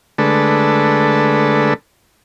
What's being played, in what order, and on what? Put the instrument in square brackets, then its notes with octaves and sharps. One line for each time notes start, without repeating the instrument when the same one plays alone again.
[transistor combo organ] D3 G#3 A3 D4 A4 B4